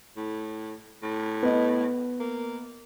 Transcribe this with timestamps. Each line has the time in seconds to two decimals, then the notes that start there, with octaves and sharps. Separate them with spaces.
0.17 A2
1.03 A2
1.43 B3 D#5
2.20 A#3